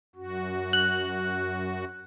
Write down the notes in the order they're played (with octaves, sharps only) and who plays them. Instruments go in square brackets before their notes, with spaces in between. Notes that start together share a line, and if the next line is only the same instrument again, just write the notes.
[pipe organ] F#2 F#4
[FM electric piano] F#6